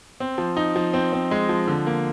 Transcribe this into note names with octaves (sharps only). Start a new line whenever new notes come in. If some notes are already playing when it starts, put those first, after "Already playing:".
C4
F3
D#4
F3
C4
C4
G#3
F3
D3
A#3